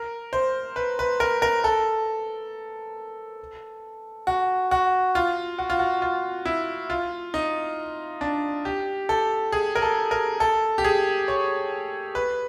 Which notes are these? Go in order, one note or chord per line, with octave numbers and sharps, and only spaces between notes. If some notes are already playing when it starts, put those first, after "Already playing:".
Already playing: A#4
C5
B4
B4
A#4
A#4
A4
F#4
F#4
F4
F#4
F4
F#4
F4
E4
F4
D#4
D4
G4
A4
G#4
A#4
A4
A#4
A4
G4
G#4
C#5
B4